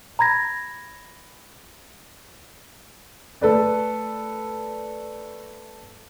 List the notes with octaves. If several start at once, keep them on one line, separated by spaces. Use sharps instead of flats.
A#5 B5 G#6 A#6
A3 A4 B4 D5